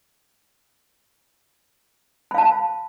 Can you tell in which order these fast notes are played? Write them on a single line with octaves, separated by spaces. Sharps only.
B5 F5 A5